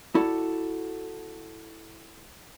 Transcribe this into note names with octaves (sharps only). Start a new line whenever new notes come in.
E4 F#4 A4 D5